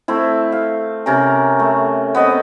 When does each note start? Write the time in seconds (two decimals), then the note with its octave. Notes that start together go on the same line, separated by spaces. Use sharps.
0.08 A3 C4 E4
0.52 F5
1.06 C3 C#4 A#4 A#5
1.59 A3
2.15 B3 C4 D#5